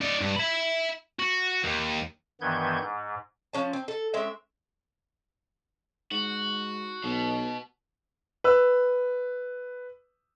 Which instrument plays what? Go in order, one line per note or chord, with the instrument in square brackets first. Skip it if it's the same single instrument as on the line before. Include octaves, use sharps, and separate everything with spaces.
[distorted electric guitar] D#4 D5
G2
E5 B5
F#4
D#2
[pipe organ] G2 D#3 E3 B3 G6 G#6
G#2
[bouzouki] F3 C#4 A5
C4
A4
G#3 C4 C#4 E5
[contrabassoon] G#2 [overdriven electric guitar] F#4
[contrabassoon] B1 [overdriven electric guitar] B2
[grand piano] B4 E6